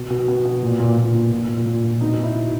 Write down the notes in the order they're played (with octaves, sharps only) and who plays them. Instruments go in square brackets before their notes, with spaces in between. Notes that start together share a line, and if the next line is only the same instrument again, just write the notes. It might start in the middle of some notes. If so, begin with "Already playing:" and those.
Already playing: [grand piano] B2
B2
B2
B2
A#2
A#2
A#2
A#2
A#2
A#2
A#2
A#2
B2 D#4
B2
E4
B2